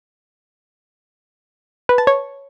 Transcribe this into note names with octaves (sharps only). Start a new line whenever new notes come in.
B4
A5
C#5